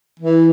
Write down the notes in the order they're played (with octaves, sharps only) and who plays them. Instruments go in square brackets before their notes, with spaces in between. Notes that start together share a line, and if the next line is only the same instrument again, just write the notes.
[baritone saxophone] E3